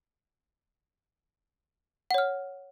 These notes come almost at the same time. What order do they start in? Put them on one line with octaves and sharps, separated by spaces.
F#5 C#5 F6